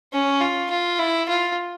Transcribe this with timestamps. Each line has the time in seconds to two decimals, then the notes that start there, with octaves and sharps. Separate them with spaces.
0.12 C#4
0.41 F4
0.70 F4
0.99 E4
1.29 F4